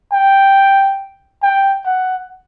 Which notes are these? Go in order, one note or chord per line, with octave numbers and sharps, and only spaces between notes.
G5
G5
F#5